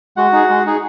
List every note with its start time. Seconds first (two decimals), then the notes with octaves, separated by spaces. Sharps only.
0.17 G#3 F#4 F#5
0.33 D#4 G#4
0.49 G#3
0.66 D#4 G#4